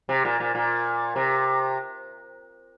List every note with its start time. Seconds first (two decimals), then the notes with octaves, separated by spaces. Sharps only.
0.09 C3
0.25 A#2
0.40 A#2
0.55 A#2
1.16 C3